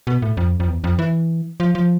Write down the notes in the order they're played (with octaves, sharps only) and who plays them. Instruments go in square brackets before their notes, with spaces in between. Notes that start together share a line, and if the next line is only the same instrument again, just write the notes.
[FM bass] B2
A2
F2
F2
E2
F2
E3
F3
F3